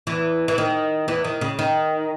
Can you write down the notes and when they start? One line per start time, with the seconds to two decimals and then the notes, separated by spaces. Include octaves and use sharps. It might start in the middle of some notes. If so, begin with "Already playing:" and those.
0.07 E2 E3
0.48 E3
0.58 D#3
1.08 E2 E3
1.24 D#3
1.41 C#3
1.59 D#3